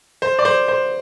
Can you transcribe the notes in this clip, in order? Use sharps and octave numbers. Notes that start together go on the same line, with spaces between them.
C5
D5
C5
C5